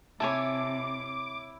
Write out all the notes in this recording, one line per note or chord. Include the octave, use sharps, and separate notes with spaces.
C3 E4 C#5 G#5 A5 D6